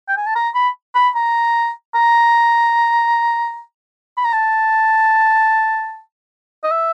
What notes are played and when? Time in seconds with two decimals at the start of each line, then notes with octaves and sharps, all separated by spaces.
0.08 G5
0.17 G#5
0.26 A5
0.35 A#5
0.55 B5
0.95 B5
1.15 A#5
1.95 A#5
4.17 B5
4.25 A#5
4.33 A5
6.64 D#5
6.71 E5